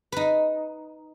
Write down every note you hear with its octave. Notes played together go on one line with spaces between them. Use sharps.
D#4 B4